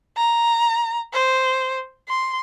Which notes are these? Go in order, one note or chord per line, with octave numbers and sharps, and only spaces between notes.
A#5
C5
C6